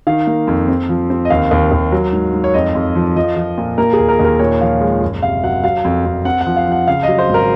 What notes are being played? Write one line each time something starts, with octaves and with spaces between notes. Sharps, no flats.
D#3 F5
A#3
F2
C4
F3
C4
D#5
D#2 F5
D#2
D#2
F#3
G#2
G#2
C#5
F2 D#5
F2
F3
F3 D#5
F3
A#2
A#3 A#4
G#4
D#2
A#4
D#2
A#4
A#2 C#5
F3 F5
G#3
F#1
C3 F5
F#3 F#5
F#3 F5
F2
F2
C4 F#5
F#5
F3
F5
F3 F#5
C#3 F5
F#3 D#5
C5
G#1
A#4